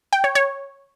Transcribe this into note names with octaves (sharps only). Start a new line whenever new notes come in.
G5
C#5
C#5